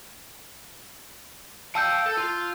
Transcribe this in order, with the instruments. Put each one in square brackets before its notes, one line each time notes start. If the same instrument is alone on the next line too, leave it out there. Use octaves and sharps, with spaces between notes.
[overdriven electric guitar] F5 G5 [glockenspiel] A5 E6 G6
[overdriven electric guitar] A4
F4